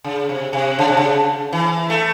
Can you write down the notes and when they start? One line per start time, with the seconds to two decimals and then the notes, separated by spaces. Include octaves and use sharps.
0.04 C#3
0.29 C3
0.53 C3
0.79 C#3
0.88 C3
0.97 C#3
1.53 E3
1.90 A3